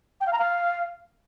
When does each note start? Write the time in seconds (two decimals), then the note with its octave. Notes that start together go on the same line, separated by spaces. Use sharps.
0.21 G5
0.27 F5
0.33 A#5
0.39 F5